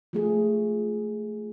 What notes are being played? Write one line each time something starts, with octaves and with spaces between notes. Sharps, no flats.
F3 A3 G#4